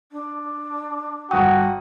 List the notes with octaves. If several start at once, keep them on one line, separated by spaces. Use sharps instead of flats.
D4
G1 F#4 G5 D#6